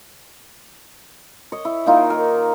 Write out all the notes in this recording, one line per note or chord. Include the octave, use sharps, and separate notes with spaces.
C#5 D#5
E4
D#3 A#3 D#4 F4
A#4